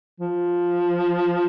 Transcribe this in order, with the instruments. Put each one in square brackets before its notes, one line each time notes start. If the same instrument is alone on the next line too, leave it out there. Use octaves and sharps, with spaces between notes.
[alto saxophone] F3